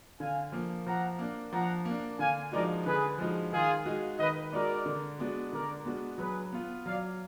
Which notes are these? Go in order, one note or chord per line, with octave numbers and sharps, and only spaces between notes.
D3 F5 G#5
F3 A#3
F3 F#5 A#5
A#3 D4
F3 F#5 A#5
A#3
D4
D3 F5 G#5
F3 G#3 D#4 F#4 A#4 D5
D3 G#4 B4
F3 G#3 D#4 F#4
D#3 F4 G#4
G#3 D#4 F#4
D#3 B4 D#5
G#3 D#4 F#4 A#4 D5
D3
G#3 B3 D4 F#4
D3 A#4 D5
G#3 B3 D4 F#4
F#3 G#4 B4
B3 F4
F#3 D5 F5